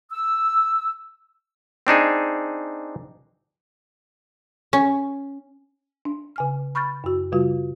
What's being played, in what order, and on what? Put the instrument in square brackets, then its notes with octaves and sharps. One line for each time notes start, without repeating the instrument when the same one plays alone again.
[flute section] E6
[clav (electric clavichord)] C4 D4 D#4 G#4
[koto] C#4
[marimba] D4
C#3 G#5 F6
B5 C#6 F6 G6 A6
F#2 F#4
C#3 G3 F4 F#4